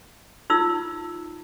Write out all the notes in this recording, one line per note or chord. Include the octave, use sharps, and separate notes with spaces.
D#4 F4 E6